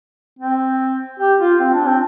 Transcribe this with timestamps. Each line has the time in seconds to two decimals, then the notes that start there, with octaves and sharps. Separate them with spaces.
0.39 C4
1.19 G4
1.40 F4
1.60 C4
1.74 D4
1.87 C4